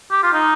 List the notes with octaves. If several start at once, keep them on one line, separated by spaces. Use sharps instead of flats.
G4
F4
D#4